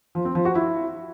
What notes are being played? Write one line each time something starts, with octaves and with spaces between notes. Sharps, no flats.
F3
C4
F3
F#4
E4